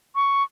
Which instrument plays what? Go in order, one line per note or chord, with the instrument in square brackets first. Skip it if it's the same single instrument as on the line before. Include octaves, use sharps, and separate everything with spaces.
[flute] C#6